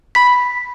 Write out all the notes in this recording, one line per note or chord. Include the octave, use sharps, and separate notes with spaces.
B5 B6